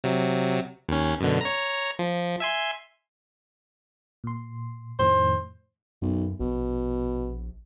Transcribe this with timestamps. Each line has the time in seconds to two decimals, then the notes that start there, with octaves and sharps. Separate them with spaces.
0.04 C3 F#3
0.89 D#2 C#4
1.20 F#2 B2 D3
1.41 C#5 A#5
1.99 F3
2.40 E5 G#5 C6
4.24 A#2 C6
4.99 F2 A2 D#3 C5
6.02 B1 F#2
6.40 A#1 B2